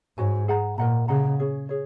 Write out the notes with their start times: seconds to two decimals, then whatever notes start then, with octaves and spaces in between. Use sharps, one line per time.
0.18 G#2 F#4 C#5 G#5
0.48 G#4 F#5 A#5
0.78 A#2 A#4 D#5 F#5 A#5
1.08 C#3 G#4 D#5 F#5 A#5
1.39 C#4 G#4 C#5
1.69 G#4 C#5